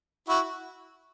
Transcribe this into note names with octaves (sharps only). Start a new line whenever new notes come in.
E4 F#4